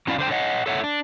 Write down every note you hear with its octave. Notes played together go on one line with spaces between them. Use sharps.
F#3 C#4 E4 D5 F5
D3 C5 G5
C#5 D#5 F#5
A4 C#5 E5 F#5
D4